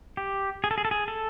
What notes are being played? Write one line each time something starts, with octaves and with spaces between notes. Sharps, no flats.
G4
G#4
A4
G#4
A4
G#4
A4